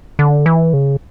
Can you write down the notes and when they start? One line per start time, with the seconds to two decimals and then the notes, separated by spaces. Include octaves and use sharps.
0.19 D3
0.46 E3
0.73 C#3